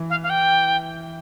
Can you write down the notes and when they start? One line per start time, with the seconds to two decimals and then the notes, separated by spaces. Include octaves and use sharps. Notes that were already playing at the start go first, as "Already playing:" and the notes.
Already playing: E3
0.10 F5
0.23 F5
0.30 G5